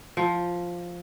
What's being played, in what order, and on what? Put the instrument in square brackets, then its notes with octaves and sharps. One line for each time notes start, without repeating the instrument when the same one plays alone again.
[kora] F3